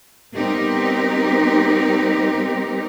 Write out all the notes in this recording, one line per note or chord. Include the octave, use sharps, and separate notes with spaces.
G3 B3 C4 D#4 G4 A#4